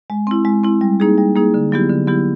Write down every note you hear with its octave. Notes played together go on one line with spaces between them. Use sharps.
G#3
C4 E4
G#3
C4 E4
G3
A#3 D#4 G#4
G3
A#3 D#4 G#4
D3
F#3 B3 E4 G4
D3
F#3 B3 E4 G4